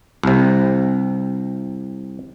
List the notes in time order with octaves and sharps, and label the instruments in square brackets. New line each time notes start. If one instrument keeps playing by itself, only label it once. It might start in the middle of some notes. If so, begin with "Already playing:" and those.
[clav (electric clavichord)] C2 C3